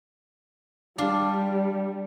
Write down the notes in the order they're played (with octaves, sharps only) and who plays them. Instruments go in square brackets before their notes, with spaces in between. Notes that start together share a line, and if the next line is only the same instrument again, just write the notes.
[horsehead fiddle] G3 [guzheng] D4 F4